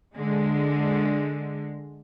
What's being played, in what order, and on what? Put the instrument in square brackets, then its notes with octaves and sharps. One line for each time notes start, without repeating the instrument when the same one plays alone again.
[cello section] D3 G#3